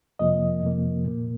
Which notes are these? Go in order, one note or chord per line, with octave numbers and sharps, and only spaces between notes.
F2 C3 F3 A#3 D#5
F2 C3 F3 A#3
A#2 A#3